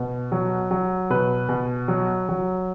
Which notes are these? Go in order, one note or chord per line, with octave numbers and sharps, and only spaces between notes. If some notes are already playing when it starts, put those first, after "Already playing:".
Already playing: B2
F#3
F#3
B2 B4
B2
F#3
F#3